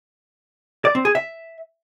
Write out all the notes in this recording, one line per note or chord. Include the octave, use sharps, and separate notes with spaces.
D5
C4
G#4
E5